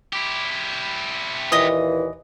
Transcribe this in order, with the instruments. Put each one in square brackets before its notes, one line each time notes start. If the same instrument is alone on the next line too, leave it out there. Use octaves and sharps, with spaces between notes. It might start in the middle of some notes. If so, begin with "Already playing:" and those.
[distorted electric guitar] E4 G4
[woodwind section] D#2 A#2 E3 [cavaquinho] D#5 D#6